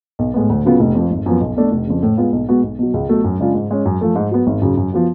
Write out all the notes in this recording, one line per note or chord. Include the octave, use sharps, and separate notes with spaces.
B1
A2 G#3 B3
D2
C#3 F#3 B3 F4
F1
F2 F3
G#1
F#2 F3 B3
B1
B2 A3 D4
F1
F2 C#3
A2
G#3 B3 F4
B1
B2 G#3 B3 F#4
B1
B2 F#3
C#2
B2 F#3 A3
F#2
C#3 G#3 D4 F4
G#2
G#3 C#4
F#2
F3 A3
G#2
F#3 B3
G#1
F#2 C#3 F#3
F#2
F3 B3 F#4